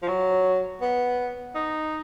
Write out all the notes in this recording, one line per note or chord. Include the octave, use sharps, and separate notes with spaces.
F3
F#3
B3
D#4